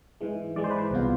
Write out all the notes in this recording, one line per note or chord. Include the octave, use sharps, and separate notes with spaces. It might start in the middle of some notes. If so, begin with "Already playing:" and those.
G#2 E3 G#3
G#2 E3 G#3 D5
C5
B4
C5
C2 B2 B3 F4